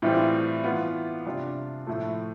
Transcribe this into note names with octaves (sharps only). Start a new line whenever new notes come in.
A2 E3 G3 C4 F4
E3 B3 F4
C3 G3 D4 F4
A2 F3 A3